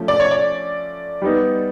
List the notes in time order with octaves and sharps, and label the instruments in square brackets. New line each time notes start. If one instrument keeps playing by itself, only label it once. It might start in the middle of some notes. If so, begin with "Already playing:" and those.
Already playing: [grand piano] F3 A3 C#4
[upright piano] D5
C#5
D5
[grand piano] G3 B3 D#4